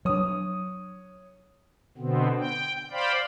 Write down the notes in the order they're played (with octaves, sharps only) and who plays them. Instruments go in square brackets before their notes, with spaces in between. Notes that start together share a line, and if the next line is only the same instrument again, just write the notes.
[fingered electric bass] F#3 D4 [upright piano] C#5 D#6
[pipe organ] B2 D3 B3 C4
G5
C5 D5 F5 G5 B5